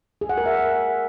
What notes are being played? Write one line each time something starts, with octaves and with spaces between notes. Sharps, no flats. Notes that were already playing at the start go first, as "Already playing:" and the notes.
G#4
F#5
A#4
E5